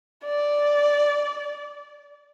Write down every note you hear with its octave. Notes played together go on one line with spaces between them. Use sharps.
D5